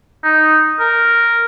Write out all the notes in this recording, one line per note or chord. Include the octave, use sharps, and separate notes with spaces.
D#4
A#4